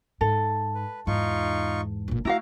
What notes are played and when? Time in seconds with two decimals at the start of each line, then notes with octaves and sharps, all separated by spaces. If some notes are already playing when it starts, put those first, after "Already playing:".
0.21 G#2 A4
0.75 B4
1.07 E2 G#2 D#4 F4 C#6
2.08 G1 A#2
2.25 A3 E4 F#4 F5 A#5